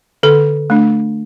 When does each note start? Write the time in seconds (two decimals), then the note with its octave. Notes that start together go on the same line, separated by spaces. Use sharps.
0.23 D3 A4
0.70 A3 D4